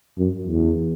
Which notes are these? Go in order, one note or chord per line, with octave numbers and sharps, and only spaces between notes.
F#2
E2